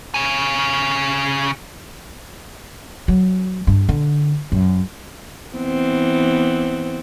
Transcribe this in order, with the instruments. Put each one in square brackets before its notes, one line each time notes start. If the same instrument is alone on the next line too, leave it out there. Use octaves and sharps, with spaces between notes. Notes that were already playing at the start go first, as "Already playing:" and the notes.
[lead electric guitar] C#3 G#5
[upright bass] F#3
G2
D3
F#2
[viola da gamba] E3 B3 C4